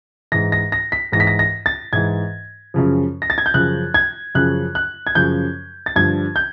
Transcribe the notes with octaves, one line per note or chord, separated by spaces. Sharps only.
G#2 E3 A#6
A#6
A#6
B6
G#2 E3 A#6
B6
A#6
A#6
A6
G#2 E3 G#6
F#2 C#3 F3
A#6
A6
G#6
G6
F#2 C#3 F3 F#6
G#6
F#2 C#3 F3 F#6
F#6
G#6
F#2 C#3 F3 G6
A6
G2 D3 F3 G#6
G6